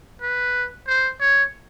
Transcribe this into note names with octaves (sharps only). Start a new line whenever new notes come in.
B4
C5
C#5